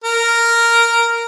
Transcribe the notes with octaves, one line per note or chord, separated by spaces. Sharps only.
A#4